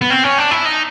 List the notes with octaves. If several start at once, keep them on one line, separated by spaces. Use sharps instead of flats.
B3
C4
C#4
D4
E4
D#4